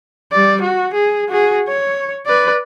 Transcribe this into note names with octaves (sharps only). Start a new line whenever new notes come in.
G3 D5
F#4
G#4
F#4 G#4
C#5
B4 D5